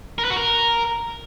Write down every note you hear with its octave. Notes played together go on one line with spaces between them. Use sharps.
A#4
B4
F#4
A#4